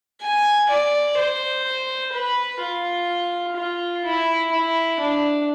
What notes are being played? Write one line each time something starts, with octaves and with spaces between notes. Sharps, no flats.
G#5
D5
C5
B4
F4
F4
E4
E4
D4